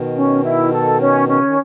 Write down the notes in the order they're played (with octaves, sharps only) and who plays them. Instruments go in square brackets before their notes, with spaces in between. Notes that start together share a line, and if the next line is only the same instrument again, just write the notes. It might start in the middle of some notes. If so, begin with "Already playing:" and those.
Already playing: [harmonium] B2 D#3
[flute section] C#4
E4
A4
C#4
[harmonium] C#3 [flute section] C#4
[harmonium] D#3